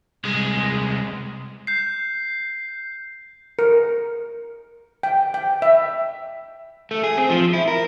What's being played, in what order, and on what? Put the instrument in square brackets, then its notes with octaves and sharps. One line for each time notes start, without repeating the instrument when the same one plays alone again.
[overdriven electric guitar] C2 G#3
[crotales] G6 C7
[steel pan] A#4
G5
G5
E5
[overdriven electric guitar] A3
G#4
C4
F3
E4
A#4